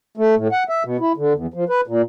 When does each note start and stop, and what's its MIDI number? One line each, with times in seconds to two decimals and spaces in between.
0.17 0.35 57
0.36 0.48 45
0.52 0.63 78
0.69 0.83 76
0.85 0.97 47
1.00 1.12 64
1.17 1.33 50
1.34 1.47 40
1.54 1.64 53
1.69 1.81 71
1.87 2.02 46